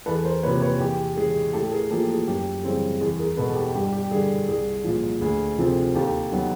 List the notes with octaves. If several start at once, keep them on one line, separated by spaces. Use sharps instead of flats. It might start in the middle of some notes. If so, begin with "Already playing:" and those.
E2 A4 B4
A#4 C5
C3 F3 A#3 B4 C#5
B4 C#5
E2 G4
C#3 E3 G#3 G#4
A2 G4 A4
G#4 A#4
F3 A#3 G4 A4
G#4
F#2 G4
C#3 E3 G3 C4 G#4
E2 G#4
G#4 A#4
B2 G#3 B3 A4 B4
G4
G2 G4
G4
D3 G3 G#4
C2 G#4
A#2 F3
D2 G#4
C3 F3 A3 C4
D#2 G4 A4
D#3 F#3 B3